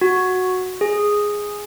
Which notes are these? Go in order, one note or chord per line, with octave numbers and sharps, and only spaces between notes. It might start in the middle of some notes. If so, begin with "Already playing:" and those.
F#4
G#4